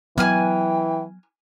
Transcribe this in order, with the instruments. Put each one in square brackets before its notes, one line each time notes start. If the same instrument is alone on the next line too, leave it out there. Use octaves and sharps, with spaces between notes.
[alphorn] E3 [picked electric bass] F#3 B3 [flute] G5 [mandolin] G#5 F6 F#6